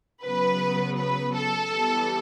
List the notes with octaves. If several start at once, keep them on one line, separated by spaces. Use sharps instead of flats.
C#3 F#3 B3 B4
B4
A4
E3 G3 B3